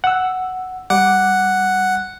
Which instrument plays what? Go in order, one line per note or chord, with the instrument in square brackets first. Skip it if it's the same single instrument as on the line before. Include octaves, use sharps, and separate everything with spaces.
[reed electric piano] F#5 E6
[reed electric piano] G3 D6 [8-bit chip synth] F#5